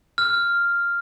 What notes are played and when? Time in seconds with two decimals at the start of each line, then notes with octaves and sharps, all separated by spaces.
0.18 F6